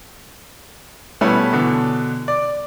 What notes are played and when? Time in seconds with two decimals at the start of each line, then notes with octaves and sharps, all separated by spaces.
1.21 B2 G3 A3 C#4 E4 B4
1.53 B2 D3 E3
2.28 D5